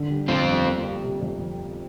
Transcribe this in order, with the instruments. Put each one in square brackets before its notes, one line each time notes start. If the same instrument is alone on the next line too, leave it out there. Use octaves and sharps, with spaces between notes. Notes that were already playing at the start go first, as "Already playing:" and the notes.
Already playing: [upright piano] D3
G3
[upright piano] F2 [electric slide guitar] C4 F4
[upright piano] G1
A#3
G4
C3
F2